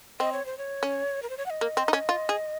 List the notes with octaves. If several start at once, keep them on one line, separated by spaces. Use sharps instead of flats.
C4 D#5
C#5
C5
C#5
C#4
A#4
C5
C#5
F#5
D#5
A#3
C4
D#4
C#4
F4
G#4